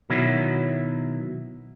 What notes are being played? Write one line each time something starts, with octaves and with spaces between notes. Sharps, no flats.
B2 D#3 F#3 E4